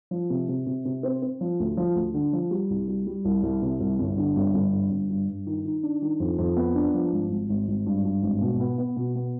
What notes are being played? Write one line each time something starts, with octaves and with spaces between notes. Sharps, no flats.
F3
C3
C3
C3
C3
C4
C4
F3
D2
F3
D2
D3
F3
G3
C2
G3
G3
C2
C2
C3
C2
G1
D3
G1
G1
G2
G1
G2
G2
D#3
D#3
D4
D#3
F2
F2
B3
D4
F3
G#1
G#1
G#1
G#1
G2
G2
G#1
B2
B3
B3
B2
B3